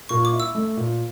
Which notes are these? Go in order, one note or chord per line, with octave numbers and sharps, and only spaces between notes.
A#2 C#6
D6
E4
E6
A3
A#2